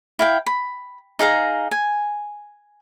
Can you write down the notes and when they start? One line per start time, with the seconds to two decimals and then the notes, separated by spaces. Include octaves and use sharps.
0.19 E4 F5 G5
0.46 B5
1.19 D#4 G#4 F5 A#5
1.71 G#5